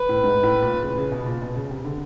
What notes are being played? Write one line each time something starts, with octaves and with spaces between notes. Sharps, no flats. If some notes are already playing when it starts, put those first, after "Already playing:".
Already playing: B4
A2
G#2
A2
A#2
C#3
C#3
B2
A#2
B2
C#3
C3
D3